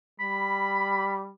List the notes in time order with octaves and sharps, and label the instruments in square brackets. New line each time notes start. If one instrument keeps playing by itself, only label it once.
[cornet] G3 [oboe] B5